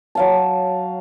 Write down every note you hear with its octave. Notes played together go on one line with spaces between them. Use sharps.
F#3 F5 A5